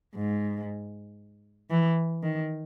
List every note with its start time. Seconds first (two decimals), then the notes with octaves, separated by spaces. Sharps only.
0.15 G#2
1.71 E3
2.23 D#3